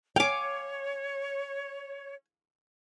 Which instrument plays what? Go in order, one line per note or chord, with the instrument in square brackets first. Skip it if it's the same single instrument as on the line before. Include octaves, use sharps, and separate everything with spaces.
[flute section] C#5 [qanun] F5 D6 [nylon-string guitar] G5 G#5